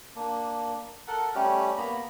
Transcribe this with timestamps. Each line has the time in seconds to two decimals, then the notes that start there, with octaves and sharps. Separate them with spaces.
0.16 A#3 D4
1.07 A4 A#4 F#5
1.35 G3 A3 C#4 G4
1.77 A#3 B3 A#5 B5